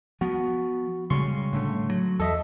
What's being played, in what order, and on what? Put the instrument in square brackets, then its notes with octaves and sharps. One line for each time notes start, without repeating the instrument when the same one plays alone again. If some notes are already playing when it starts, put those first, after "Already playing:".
[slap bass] F3 B3 [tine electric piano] F#4
[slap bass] C#3 G3 G#3 [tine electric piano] C6 C#6
[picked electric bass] A2 D3 A3
[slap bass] F#3
[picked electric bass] E2 [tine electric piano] A4 D#5 E5